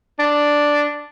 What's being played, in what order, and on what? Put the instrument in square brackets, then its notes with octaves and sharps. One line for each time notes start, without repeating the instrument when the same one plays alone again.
[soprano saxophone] D4